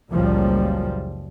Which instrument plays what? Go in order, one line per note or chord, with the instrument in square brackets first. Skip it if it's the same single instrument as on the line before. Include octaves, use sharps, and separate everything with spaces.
[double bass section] F#1 C#2 F#2 A#2 F3 G3